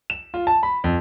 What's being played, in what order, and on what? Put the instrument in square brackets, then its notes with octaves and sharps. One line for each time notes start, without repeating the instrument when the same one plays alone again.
[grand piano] E7
F4
A5
B5
F2